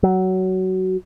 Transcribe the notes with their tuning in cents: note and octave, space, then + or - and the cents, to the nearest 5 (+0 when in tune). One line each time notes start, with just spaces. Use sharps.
F#3 +15